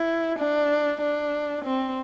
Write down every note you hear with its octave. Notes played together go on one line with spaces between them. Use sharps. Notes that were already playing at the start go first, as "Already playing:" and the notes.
Already playing: E4
D4
D4
C4